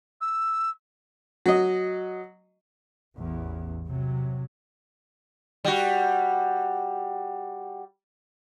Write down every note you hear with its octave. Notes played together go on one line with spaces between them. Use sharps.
E6
F#3 D#5
A1 E2
C3 F#3
G3 F#4